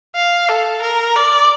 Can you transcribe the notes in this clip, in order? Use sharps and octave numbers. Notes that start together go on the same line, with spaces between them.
F5
A4
A#4
D5